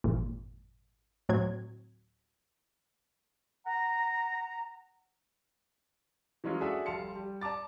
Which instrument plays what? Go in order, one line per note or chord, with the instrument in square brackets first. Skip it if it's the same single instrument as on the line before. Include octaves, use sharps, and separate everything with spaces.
[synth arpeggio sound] G#1 F2 A#2
D2 A2 F#3 C4 G#6
[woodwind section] F#5 A#5
[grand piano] E3 F#3 G#3 C#4 F4
D4 F#4 G#4 A4 E5 G#5
F1 G3 F5 A5 C6 C#7
G3
D5 A5 A#5 D6 A6